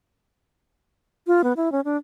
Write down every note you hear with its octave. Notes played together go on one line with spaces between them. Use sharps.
F4
B3
E4
C#4
D4